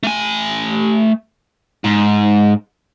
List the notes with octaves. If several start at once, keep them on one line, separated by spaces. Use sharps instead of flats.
A3 G#5
G#2